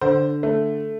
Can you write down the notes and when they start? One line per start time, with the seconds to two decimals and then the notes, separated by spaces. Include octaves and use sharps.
0.01 D3 C5
0.43 A3